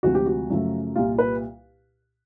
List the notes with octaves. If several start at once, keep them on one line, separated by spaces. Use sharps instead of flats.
D2 C3 F3 G#3 F#4
G4
F#4
F#2 C#3 F3 A3
C2 A#2 G3 F4
B4